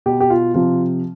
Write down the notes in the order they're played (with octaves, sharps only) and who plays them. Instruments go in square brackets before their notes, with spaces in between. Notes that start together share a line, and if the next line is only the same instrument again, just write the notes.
[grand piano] B2 G4
G4
F4
C3 F3 F4